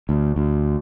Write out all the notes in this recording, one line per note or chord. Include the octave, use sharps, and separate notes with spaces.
D2
D2